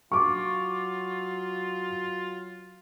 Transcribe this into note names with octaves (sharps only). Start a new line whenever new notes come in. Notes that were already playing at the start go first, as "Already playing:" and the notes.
F#3 F4 C#6 D6